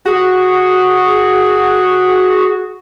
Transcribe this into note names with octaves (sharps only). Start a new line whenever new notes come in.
F#4 G#4